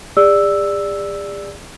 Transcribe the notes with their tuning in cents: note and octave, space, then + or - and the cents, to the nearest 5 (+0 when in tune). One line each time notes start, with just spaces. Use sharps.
G#4 -45 D5 +0 E6 +0